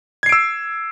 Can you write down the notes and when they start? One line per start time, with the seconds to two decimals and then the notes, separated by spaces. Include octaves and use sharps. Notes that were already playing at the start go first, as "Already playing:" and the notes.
0.23 G#6
0.26 C7
0.29 D7
0.32 E6